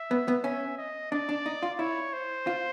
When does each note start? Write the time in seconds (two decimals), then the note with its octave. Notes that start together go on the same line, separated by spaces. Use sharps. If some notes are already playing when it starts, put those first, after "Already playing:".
Already playing: E5
0.11 B3
0.28 B3
0.44 C#4 E5
0.78 D#5
1.11 D4 D5
1.29 D4
1.46 D#4
1.63 F4
1.79 E4 C#5
2.13 C5
2.47 F4